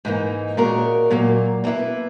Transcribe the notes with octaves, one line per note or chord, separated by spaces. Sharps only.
G#2 E3 A#3 D#4
A#2 G#3 C#4 F#4 A#4
A#2 F#3 A#3
B2 A#3 E4 B4